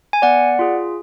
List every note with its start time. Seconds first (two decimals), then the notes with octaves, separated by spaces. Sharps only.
0.13 G#5
0.22 B3 D5 F#5
0.59 F4 G#4